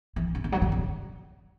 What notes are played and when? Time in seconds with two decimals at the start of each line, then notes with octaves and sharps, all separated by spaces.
0.16 E3
0.35 C#3
0.44 D3
0.52 F#3
0.62 D3
0.72 C#3